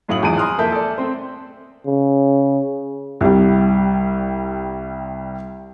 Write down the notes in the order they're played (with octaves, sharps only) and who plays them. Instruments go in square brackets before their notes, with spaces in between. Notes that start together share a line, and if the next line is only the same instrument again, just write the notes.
[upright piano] F#2 A2 F#3 F5 D#6 F#7
G#1 E2 F3 D7 D#7
G#5 A#5 C6 D#6 F6 F#6
F2 A#3 A4 E5 A5 G6
A4 D5
A3 C4 C5
[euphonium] C#3
[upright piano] C2 G3